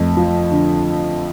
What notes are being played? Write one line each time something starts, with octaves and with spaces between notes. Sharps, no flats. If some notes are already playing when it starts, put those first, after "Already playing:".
Already playing: F2 A3
F3
D3